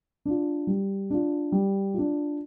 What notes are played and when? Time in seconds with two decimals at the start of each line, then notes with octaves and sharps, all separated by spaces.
0.25 D4 F4
0.67 G3
1.10 D4 F4
1.52 G3
1.94 D4 F4